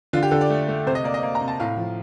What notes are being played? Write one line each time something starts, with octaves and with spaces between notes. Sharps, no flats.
D3 F4
G4
D3 A4
D5
A3
A3
C3 C5
D#5
A#3 D5
D#5
A#3
A#5
C3
A5
A2 F5
F3